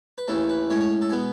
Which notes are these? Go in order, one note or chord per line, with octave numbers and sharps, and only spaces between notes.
B4
D#2 C#3 E3 A3 A4
B4
A2 G#3 C#4 C#5
C#5
A4
B2 G#3 B3 G#4